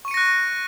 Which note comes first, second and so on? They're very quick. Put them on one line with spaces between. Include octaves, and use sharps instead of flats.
C#6 D#7 C#7 A#6 F#6